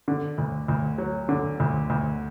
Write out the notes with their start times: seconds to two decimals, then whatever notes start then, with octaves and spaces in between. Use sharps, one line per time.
0.08 D3
0.38 D2
0.68 D2
0.98 F#3
1.29 D3
1.60 D2
1.90 D2